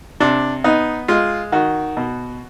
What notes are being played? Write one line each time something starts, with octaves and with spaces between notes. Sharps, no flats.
C3 D4
B3 D#4
G#3 F4
D#3 F#4
B2